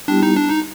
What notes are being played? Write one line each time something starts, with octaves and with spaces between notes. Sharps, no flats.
G3 B3 D4 E4 G4
D#4
D4
D#4